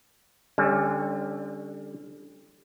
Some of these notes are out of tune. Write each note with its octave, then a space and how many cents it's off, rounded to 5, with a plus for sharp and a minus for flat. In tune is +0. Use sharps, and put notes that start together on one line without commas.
D3 +0 G3 +30 C#4 +0